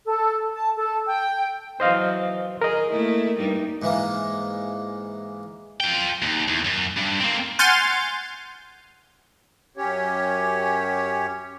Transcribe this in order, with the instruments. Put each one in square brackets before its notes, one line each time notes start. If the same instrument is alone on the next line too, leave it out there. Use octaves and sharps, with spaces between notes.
[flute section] A4
A5
A4
G5
[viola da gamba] E3 F#3 [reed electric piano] C5 D#5 F5
[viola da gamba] G#4 [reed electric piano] A#4 D#5
[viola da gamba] A3 A#3 E4
G2 G3 D#4
[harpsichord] G#2 E3 A#3
[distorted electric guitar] F4 G5
D#2
E2
F#2
G2
A#3 C4
[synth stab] F#5 G#5 C6 F6 G6 A6
[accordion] F#2 C#4 G4 C#5